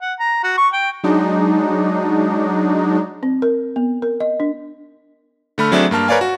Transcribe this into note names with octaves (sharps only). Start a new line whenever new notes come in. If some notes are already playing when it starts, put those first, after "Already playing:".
F#5
A#5
F#4
C#6
G5
F#3 G#3 D4 D#4
C4
A#4
B3
A#4
D#5
D4
D3 A3 B5 F6
F#3 A3 C4 D4 G#4 E5
G2 A#3 A5 F6
A#4 B4 C#5 D5 F5 G#5
F#4